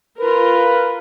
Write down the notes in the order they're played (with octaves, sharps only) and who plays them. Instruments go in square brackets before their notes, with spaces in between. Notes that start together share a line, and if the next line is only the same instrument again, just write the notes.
[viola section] F4 A#4 [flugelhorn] B4